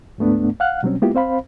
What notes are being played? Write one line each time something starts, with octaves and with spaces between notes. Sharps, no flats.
D2 G#2 A3 B3 D4
F5 F#5 F6 F#6
B2 F#3 G3 C4 C#4
G#3 A#3 B3 E4 F4 G4
C4 C5 F5 B5